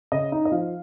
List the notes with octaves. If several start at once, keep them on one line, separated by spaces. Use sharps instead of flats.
C#3 D#5
D#4 D#5
D#5
F3 F5